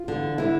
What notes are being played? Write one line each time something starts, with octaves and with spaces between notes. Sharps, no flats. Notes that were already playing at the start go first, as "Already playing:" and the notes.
Already playing: F4
E2 D3
D3 E4